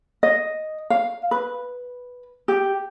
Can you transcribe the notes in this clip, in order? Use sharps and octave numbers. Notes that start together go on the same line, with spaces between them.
D#5
F5
B4
G4